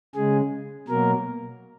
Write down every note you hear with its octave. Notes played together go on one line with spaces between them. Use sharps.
C#3 G#3 G#4
B2 F#3 A#3 A#4